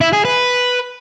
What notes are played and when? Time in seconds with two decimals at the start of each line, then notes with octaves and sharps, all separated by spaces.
0.01 E4
0.13 G#4
0.25 B4